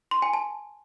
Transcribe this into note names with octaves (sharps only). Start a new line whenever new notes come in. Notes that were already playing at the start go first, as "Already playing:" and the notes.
C6
G#5
A5